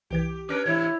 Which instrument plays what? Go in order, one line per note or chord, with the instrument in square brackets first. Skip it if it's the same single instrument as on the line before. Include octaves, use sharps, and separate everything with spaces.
[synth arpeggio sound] C2 E3 G#6 [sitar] G4
[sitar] C#4 D4 A#4 [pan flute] B4 [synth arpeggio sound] D6 F6 A#6
[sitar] G#2 C3 E3 [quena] E4 [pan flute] C#5